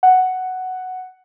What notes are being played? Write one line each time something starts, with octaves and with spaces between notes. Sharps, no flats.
F#5